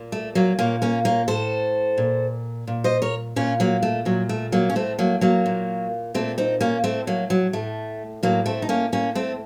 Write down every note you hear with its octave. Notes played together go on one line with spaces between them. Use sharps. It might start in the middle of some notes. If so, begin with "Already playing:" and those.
Already playing: A#2
A3
F#3 A#3
A#2 A#3 C#4
A#3 C#4
A#3 C#4
A2 A4 C5
A#2
A#2
C5 D#5
A#4 C#5
A#2 C#4 F4
F#3 A#3
A3
A#2 F#3
A3
F#3 A#3
C#4
A2 A3 C4
F#3 A#3
F#3 A#3
A#2
A#2 A3 C4
C4 D#4
A#3 C#4
A2 A3 C4
F#3 A#3
F#3
A2 A3
A2 F#3 A#3
A3 C4
D#4
A#3 C#4
A2 A#3 C#4
A3 C4